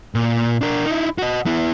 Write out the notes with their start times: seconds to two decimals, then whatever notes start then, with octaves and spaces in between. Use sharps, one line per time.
0.15 A#2
0.61 D4 A#4
0.86 D#4 E4
1.18 F#4 D#5
1.46 B3 E4